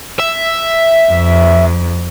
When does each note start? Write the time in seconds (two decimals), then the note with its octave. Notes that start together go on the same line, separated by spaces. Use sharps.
0.20 E5
1.12 F2